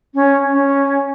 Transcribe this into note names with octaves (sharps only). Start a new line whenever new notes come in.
C#4
C#4